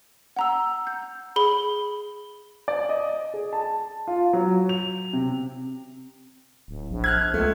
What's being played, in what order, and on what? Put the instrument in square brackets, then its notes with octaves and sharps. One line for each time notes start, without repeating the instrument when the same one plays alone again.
[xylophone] F#5 A#5 E6
G6
G#4 B5 G7
[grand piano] D5
D#5
G#4
A5
F4
F#3
F7
C3
[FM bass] D1
A#1
[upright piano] F6 F#6 G#6
[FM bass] C#2 [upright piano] A3